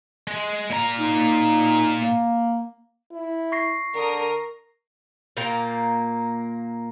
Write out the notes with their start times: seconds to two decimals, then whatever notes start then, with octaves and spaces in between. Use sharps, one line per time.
0.27 G#3
0.71 A#2 A#5
0.99 D#4
2.01 A#3
3.12 E4
3.52 C#6 A#6 C7
3.95 D3 A#4 D#6
5.37 A#2 A#3 G5 A#5